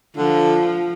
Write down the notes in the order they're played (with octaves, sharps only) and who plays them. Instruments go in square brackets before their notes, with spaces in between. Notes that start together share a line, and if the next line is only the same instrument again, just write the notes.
[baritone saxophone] D3 [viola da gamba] F3